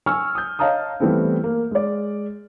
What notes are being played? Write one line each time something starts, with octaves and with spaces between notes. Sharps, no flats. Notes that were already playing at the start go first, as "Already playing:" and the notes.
G#5 C#6 E6 F6
D#6 G6
C#5 D#5 F5 A5 A#5 D#6
E3 G3 A3 B3 C4
A#3
G#3 D5